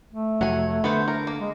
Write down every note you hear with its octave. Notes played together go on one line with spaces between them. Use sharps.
A3
F1 F#3 F#5 G#5
D3 B3 B4 C5
A#4
A#3
G#3